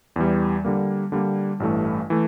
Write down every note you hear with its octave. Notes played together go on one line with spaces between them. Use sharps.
E2 E3 G3
D3 G3 A#3
D3 G3 A#3
A1 G2 E3 A3
E3 A3